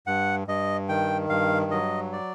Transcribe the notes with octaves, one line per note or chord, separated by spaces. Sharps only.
G2 F#5
G2 D#5
D#3 G5
G2 F5
F#3 D#5
D5